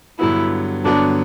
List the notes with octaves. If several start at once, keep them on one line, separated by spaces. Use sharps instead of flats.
G2 D3 F#3 B3 E4
G2 D3 F#3 B3 D4